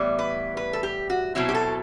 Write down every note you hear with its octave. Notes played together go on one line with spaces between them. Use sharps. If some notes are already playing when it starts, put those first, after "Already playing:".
Already playing: A2 E3 G3 B3
B4
B4
A4
G4
F#4
B2 F#3 C4 E4
G4
A4